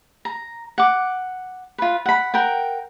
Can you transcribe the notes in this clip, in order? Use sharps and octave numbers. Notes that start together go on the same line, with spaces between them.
A#5
F#5 D6
F4 B4
F#5 B5
A#4 F#5 G5